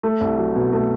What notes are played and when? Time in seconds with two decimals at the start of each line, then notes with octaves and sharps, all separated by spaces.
0.03 A3
0.21 C2
0.38 F#3
0.56 B2
0.73 A3